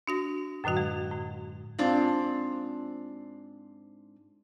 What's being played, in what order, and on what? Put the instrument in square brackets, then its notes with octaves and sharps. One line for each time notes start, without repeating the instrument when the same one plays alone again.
[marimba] D4 F#4 A#6
F#2 A2 D3 F#3 F#4
G#3
A2
[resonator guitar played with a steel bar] G#2 C4 D4 F4